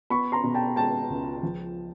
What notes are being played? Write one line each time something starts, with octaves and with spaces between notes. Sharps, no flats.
B3 B5 C#6
A#5 C6
B2
G5 A5
G#3 G5 A5
C#2
F3